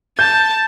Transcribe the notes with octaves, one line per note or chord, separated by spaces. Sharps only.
A5 G6